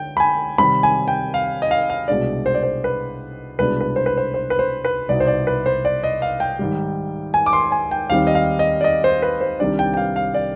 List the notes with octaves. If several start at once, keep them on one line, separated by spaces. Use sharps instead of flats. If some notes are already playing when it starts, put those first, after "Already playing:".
Already playing: D3 G5
B5
G#5
C3 D#3 G3 C4 B5
G#5
G5
F5
D#5
F5
F5
C2 B2 G#3 D4 D5
C5
D5
C5
B4
C2 B2 G#3 D4 B4
B4
C5
B4
C5
C5
B4
C5
B4
C2 B2 B3 D#4 D5
C5
D5
B4
C5
D5
D#5
F5
G5
G#2 D#3 G3
G#5
D6
C6
G#5
G5
D#2 D#3 G3 C4 F5
D#5
F5
D#5
D5
D#5
C5
B4
C5
C2 C3 D#3 G3 D4 D5
G5
G5
F5
F5
D5